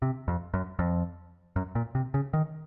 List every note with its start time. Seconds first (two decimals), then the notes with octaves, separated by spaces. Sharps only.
0.02 C3
0.28 F2
0.54 F#2
0.79 F2
1.56 F#2
1.75 A#2
1.95 C3
2.14 C#3
2.33 D#3